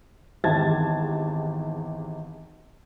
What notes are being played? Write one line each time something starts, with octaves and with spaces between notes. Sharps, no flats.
G#1 E2 G4 A5 G#6 A6